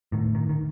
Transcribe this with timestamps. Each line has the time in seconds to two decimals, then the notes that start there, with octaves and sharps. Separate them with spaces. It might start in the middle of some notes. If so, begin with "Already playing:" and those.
0.12 A2 D#3
0.35 D#3
0.49 D#3